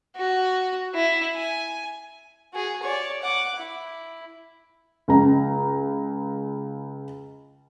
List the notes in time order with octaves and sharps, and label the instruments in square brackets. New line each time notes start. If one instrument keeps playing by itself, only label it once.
[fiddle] F#4
E4
G#5
F#4 G#4
C#5 D5
F#5 D6
E4
[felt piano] C#2 A#5